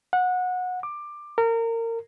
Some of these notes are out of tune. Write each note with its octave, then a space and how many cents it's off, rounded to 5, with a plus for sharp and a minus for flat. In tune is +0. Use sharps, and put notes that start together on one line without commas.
F#5 -20
D6 +15
A#4 -25